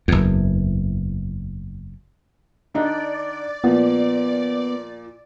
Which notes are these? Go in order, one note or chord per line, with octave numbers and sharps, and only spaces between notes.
F#1 E2
D3 D4 D#4 D5
A#2 F3 B3